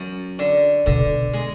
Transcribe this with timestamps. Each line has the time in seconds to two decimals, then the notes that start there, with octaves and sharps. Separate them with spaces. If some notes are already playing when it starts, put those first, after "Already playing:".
Already playing: F#2
0.39 D3
0.86 B2 D3
1.34 G#3